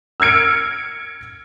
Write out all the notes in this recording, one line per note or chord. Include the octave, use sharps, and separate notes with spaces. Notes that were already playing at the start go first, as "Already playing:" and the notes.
E6 F6 G#6 C#7 D7